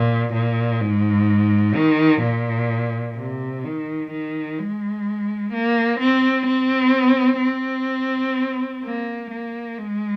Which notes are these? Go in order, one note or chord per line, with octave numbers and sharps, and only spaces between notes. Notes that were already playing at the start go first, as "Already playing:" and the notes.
Already playing: A#2
A#2
G#2
D#3
A#2
C3
D#3
D#3
G#3
A#3
C4
C4
C4
A#3
A#3
G#3